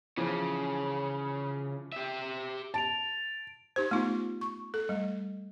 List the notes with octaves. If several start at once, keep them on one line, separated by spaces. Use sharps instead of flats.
C#3 E3 F3
G4 E5
A5 A6 D7 F7
D#4 G4 C5
A3 B3 D#4 F4
C#6
A4
G3 A3